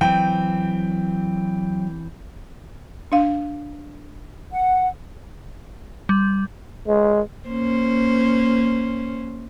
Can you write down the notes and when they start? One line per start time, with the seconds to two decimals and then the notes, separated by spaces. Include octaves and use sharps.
0.01 E3 F#3 C4 G5
3.12 D4 F5
4.51 F#5
6.09 G3
6.88 G#3
7.48 A#3 C#4 C5